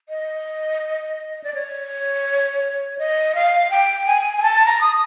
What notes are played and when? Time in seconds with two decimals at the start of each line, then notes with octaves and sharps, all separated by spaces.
0.09 D#5
1.44 D5
1.54 C#5
2.98 D#5
3.35 F5
3.70 G5
4.06 G#5
4.37 G#5
4.42 A5
4.66 A#5
4.81 D#6